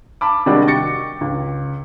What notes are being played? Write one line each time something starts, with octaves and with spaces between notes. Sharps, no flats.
A5 B5 D6
C3 D#3 G3 G#3 D4 F#4
G5 C#6 A6 A#6 C#7
C#2